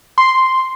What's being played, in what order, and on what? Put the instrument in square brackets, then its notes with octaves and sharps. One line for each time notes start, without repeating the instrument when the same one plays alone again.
[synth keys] C6